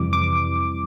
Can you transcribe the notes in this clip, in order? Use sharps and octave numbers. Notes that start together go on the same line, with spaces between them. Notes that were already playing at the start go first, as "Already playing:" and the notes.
Already playing: F2 C3 E3 G3 D6
D6